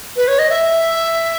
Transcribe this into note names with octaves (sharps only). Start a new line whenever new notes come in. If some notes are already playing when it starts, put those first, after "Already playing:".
B4
C#5
D#5
E5